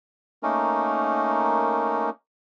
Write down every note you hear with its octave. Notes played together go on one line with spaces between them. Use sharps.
A3 A#3 C#4 D#4 A#4